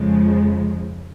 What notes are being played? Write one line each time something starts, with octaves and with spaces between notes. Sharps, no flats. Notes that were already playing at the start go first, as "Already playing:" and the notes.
Already playing: F2 C#3 F3 G#3